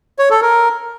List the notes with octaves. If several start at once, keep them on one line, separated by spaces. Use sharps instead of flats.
C#5
A4
A#4